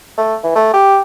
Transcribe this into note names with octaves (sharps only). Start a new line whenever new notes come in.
A3
E3
A3
G4